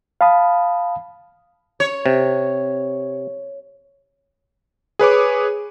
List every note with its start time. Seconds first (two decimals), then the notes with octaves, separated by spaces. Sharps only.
0.21 F5 A5 B5 D#6
1.80 C#5
2.06 C3
4.99 G#4 B4 C#5 D6